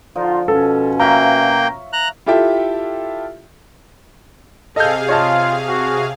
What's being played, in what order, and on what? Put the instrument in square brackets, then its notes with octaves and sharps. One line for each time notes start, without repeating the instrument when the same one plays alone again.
[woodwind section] D3 D#4 F4 [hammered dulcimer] F3
[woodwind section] B2 C#4 [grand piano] A4
[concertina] A#3 G5 [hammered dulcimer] C#5 E5 F5 [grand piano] A#5
[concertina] A#5 F#6
[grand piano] E4 F4 G4 A4 E5 G5
[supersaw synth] C3 G#4 F5 [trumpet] A4 [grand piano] D#5 G6
[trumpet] F4 [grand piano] C#5 D#5 A5
[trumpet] F#4